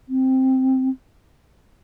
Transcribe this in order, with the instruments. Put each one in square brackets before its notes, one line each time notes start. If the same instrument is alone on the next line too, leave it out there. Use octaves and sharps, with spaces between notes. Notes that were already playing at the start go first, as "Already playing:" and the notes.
[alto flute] C4